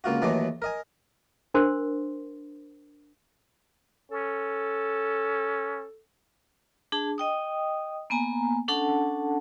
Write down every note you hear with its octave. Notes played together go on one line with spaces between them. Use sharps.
C#2 A#3 F4 F#4
D#2 E3 F#3 A3 D#5 D6
A#4 D#5 G#5
D4 A#4 C5 C6
C#4 A4
D4 G#4 A5
D#5 G5 D#6
A#3 B3 G#5 A#5
C#4 D4 A4 F#5 A5